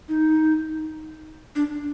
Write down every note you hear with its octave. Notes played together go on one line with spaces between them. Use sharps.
D#4
D4